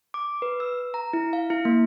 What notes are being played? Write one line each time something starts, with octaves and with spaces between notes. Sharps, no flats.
D6
B4
E6
A#5
E4
F5
E4
A#3